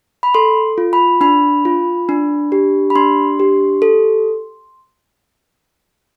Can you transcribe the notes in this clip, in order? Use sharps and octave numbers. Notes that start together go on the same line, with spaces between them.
B5
A4 C6
F4
B5
D4 B5
F4
D4
G4
B5
D4 C6
G4
A4